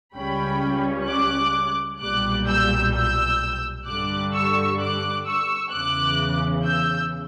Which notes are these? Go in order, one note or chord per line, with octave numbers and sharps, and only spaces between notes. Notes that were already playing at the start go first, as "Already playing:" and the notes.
C#2 C#3 G3 C#4 G5 B5
D6 F#6
B1 A#2 G3 D6 F#6
E6 G6
E6 G6
G2 D3 G3 D6 F#6
C#6 E6
D6 F#6
C#6 E6
E2 C#3 E3 D6 F#6
E6 G6